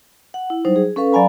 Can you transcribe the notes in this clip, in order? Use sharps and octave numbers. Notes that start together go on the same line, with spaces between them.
F#5
E4
F#3 G3 D#4 C5
G#4
C#4 A4 B4 F5 C#6
F#3 D5 F5 G#5 A#5 B5